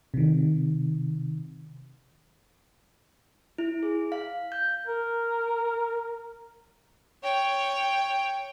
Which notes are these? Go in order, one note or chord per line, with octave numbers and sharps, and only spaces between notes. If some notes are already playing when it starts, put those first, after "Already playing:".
C3 D#3
E4
G#4
F5
G6
A#4
C#5 G5